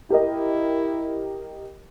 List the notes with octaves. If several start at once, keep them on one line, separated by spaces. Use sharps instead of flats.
E4 G4 A#4 D#5